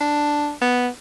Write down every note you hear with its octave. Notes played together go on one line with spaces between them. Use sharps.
D4
B3